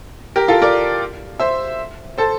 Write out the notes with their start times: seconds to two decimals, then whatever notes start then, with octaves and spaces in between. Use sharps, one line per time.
0.36 G4 A#4
0.48 F4 A4
0.62 A#4 D5
1.40 C5 E5
2.18 A4 C5